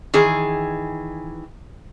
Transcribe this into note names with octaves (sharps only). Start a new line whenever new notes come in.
D#3 E3 G#4